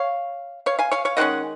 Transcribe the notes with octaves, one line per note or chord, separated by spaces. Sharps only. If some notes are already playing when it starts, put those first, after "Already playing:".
Already playing: C#5 F5
C#5 F5
F5 G#5
C#5 F5
C#5 F5
D#3 G#3 C#4 D#5 F#5